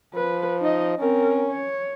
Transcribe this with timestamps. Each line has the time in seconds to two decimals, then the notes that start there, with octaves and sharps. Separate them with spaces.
0.14 F3 B4
0.61 D#4 D#5
0.99 C4 C#4 A#4
1.49 C#5